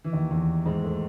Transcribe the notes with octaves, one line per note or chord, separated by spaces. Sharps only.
E3
D#2 D#3
E2 E3
G#2 G#3
A2 A3